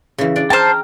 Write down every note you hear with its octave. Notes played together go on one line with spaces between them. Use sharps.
C#3 E3
D4 D5
C5 G5 A5 A#5 F6